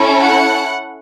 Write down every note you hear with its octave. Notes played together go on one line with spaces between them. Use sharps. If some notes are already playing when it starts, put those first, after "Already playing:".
Already playing: C#4 E4 A4
F#5